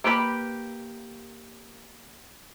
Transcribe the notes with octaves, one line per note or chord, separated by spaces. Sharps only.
A#3 G4 B4 C#5 B5